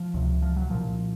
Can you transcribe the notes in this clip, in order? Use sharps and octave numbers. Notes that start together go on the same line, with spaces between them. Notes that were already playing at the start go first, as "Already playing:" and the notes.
Already playing: F3
C#2 C3
F3
F#3
C2 A#2 F3